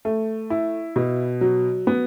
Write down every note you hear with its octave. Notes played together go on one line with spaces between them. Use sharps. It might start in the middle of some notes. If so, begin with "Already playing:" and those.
A3
E4
B2
F#3
B3